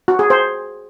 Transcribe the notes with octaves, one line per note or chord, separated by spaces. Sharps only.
F#4
G#4
C5